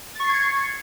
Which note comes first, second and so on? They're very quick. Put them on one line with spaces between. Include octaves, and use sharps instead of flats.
A6 C#6 C7 G#6 C#7